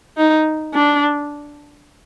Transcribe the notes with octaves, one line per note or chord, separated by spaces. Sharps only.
D#4
D4